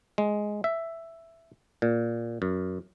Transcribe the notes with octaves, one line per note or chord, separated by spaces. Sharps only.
G#3
E5
A#2
F#2